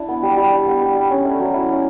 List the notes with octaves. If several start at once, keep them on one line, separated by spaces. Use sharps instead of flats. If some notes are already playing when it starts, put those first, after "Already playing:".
Already playing: D4 E4
B3
G3
G3
D4
B3
G3
G3
C#4
A3
F#3
E4
C#4